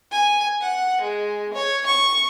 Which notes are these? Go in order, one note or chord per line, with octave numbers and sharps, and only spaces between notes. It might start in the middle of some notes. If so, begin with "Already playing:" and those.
G#5
F#5
G#3
C#5
C#6